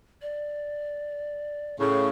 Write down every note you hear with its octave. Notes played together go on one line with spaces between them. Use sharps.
D5
A2 C#3 C#6